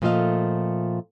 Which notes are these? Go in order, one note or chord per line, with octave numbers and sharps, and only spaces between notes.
A#2 F3 A3 F4 D#5 F5